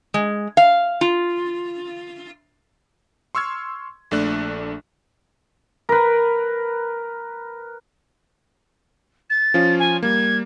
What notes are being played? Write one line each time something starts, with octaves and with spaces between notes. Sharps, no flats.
G#3
F5
F4
C6 C#6 E6 F6 G#6
A#1 A3 D4 F#6
A#4 B4
A6
F3 C#4 F4
G#5
G3 A#3 G#6